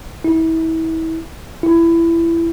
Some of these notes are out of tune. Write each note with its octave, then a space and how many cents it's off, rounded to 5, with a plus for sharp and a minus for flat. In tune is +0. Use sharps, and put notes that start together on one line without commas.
E4 -30
E4 +20